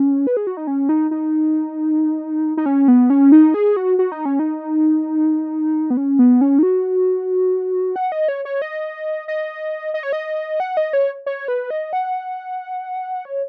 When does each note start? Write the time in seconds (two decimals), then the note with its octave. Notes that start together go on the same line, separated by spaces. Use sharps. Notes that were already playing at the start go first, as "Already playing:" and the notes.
Already playing: C#4
0.27 B4
0.37 G#4
0.47 F#4
0.57 D#4
0.67 C#4
0.89 D#4
1.11 D#4
2.57 D#4
2.66 C#4
2.88 B3
3.10 C#4
3.32 D#4
3.54 G#4
3.77 F#4
3.99 F#4
4.12 D#4
4.25 C#4
4.39 D#4
5.90 B3
5.97 C#4
6.19 B3
6.41 C#4
6.59 D#4
6.63 F#4
7.96 F#5
8.12 D#5
8.28 C#5
8.45 C#5
8.62 D#5
9.28 D#5
9.94 D#5
10.03 C#5
10.13 D#5
10.60 F#5
10.77 D#5
10.93 C#5
11.26 C#5
11.48 B4
11.70 D#5
11.93 F#5
13.25 C#5